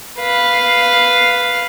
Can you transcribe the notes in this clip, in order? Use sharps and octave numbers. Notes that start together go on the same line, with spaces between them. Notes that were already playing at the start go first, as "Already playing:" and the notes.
B4 F5